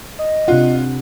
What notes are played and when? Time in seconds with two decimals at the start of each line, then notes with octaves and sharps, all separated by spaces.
0.19 D#5
0.48 C3 D4 F4 F#5